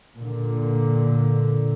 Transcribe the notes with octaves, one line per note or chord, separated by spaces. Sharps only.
A#2 D3